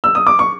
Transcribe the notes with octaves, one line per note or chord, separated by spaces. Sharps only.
E6
D#6
D6
C#6